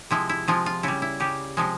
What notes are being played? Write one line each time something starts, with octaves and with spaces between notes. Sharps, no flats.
C3 F3 G#3 E4
E4
C3 F3 G#3 F4
F4
C#3 G3 E4
E4
C#3 G3 G4
C3 F3 G#3